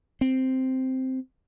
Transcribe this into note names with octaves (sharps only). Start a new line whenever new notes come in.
C4